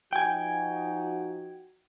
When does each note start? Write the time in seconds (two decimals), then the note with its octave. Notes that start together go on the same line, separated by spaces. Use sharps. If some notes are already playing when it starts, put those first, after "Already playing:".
0.13 F3 D#4 F#4 G5 G#5